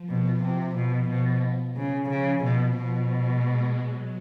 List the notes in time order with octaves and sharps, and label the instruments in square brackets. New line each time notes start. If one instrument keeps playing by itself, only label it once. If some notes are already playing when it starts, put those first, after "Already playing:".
Already playing: [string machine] F3
[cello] B2
C3
[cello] B2 [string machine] F3
[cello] B2
C#3
[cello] C#3 [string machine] F3
[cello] B2
B2
[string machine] G#3
F#3